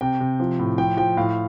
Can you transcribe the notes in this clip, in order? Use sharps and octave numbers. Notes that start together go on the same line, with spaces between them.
C3 G5
C3
F3
A2
F3 G5
F3 G5
A2 F5